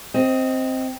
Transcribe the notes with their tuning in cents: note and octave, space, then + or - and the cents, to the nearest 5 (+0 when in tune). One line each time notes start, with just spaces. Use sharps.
C4 +0 D#5 +15